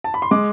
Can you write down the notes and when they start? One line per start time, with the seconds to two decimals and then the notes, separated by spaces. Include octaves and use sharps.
0.04 A5
0.14 B5
0.22 C6
0.31 G#3 D6